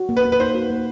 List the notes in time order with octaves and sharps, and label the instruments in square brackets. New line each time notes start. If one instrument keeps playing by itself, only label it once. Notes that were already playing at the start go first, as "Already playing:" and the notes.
Already playing: [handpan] F#4
A#3
[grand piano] B4
[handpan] A#3
[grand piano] B4
[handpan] D#4 [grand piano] C5
[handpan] F#4
A#3